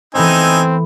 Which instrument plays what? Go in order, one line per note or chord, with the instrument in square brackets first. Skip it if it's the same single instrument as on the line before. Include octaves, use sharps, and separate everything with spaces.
[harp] E3 A3 B3 [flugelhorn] C4 [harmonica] D#4 G#5 E6